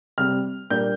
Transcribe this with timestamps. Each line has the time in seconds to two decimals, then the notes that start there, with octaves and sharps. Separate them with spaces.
0.18 C3 G3 C4 F6
0.70 A#2 G3 A#3 D4 G6